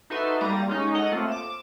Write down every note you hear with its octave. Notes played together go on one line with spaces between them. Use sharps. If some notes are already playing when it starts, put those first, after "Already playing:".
D#4 F#4 A4 B4 E5 C6
G3 A#3 A#5 A6 D#7
G#3 C#4 D#4
A4 C#5 D#5 F#5
A3 A#3 C4 F4
D6 E7